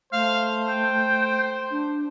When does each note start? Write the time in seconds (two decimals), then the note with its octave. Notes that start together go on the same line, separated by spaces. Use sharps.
0.13 A3 C5 F5
0.68 G5
1.71 D4